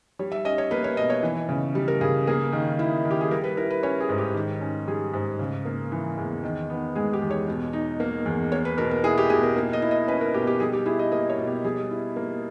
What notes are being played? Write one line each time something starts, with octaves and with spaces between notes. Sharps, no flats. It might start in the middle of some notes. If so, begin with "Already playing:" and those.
G3 C#5
E5
C#4 D#5
C#5
A#3 B4
C#5
B2 D#5
C#5
E3
C#3
G3
A#4
C#3 G#4
A#3 G#4
D#3
E4
D#3
G4
G#4
G3 A#4
B4
E4 A#4
B4
C#4 C#5
G#4
G#2
G4
D#3
C#4
G3 G#4
G#2
C#3
A#3
E3
E2
D#3
B3
G#3 G#4
G4
E2
C#5
B2
D#4
A#3
E2
A#3 C#5
B4
B2 A#4
A#4
E4 G#4
G4
B2 G#4
A#4
A#3
D#5
E4
D#5
C#4 B4
A#4
B2 G4
G4
G3 G#4
G4
E4 G#4
D#5
A#3 D#5
C#5
B2
G4
G3 G#4
E4
A#3